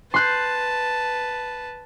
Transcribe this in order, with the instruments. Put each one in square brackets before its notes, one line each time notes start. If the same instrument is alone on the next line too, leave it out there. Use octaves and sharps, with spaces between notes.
[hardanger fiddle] B4 A5 [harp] C6 F#6 G6